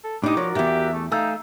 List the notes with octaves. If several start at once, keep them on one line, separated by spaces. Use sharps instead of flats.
A4
A2 D4 D#4 G4 D#5 D6
F3 F#4 A#4 C#5 D5
E2 G#2 G4 E5
A3
A3 D#4 F5 G#5 E6 G6